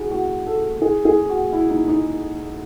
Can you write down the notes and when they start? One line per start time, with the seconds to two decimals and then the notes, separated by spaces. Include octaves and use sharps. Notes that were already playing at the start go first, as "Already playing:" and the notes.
Already playing: E4 F#4 G#4
0.11 F#4
0.46 A4
0.82 G#4
1.05 G#4
1.29 F#4
1.53 E4
1.70 D#4
1.88 D#4